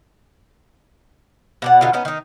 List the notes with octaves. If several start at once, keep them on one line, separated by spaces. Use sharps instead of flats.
B2 D5 F#5
B2 D3 D#4 F4
B3 C#4 D#4
D#3 D#4